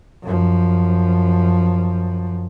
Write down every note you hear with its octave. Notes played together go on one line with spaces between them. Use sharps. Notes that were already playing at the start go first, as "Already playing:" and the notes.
F#2 F3